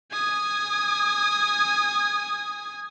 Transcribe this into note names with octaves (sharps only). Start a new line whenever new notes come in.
G#5 D#6